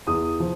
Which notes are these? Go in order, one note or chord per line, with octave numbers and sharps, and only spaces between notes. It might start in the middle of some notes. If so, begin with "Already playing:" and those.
E2 D#6
F3